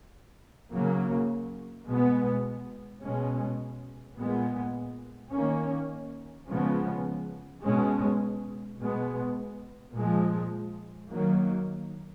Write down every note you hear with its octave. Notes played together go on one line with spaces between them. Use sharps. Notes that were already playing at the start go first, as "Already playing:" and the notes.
C#3 F#3 A#3
B2 G#3 B3
B2 G#3 C#4
A#2 G#3 B3
D#3 A#3 C#4
C#3 F3 G#3 B3
B2 G#3 C#4
B2 G#3 B3
A#2 F3 G#3
D#3 F#3 A#3